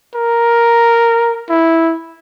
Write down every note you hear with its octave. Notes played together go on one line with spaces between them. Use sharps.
A#4
E4